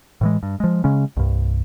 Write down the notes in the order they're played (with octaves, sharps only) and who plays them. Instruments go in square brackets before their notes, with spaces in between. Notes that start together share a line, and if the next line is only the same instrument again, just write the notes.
[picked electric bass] A2 E3 G#3
G2
F3 G#3
C#3 G#3 C#4
C2 G2